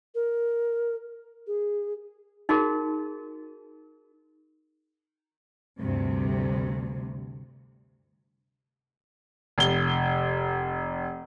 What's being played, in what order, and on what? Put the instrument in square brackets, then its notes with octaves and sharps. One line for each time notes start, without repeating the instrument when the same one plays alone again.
[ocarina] A#4
G#4
[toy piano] D#4 F#4 G#4 A#4
[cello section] D2 G2 C3
[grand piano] F1 G7